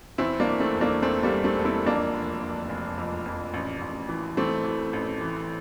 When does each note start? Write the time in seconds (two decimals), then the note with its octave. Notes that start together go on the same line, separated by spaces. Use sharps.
0.18 E2 C4 E4
0.40 A#3 D4
0.47 E3
0.60 A3 C4
0.75 E1
0.81 A#3 D4
1.02 E2 A3 C4
1.23 G3 A#3
1.30 E1
1.44 A3 C4
1.58 E1
1.65 C4 E4
1.86 F2 A#3 D4
2.14 F1
2.42 F1
2.69 F1
2.98 F2
3.26 F2
3.54 A1
3.82 A1
4.09 E3
4.37 E3 A3 C4
4.65 E3
4.93 A1
5.21 E3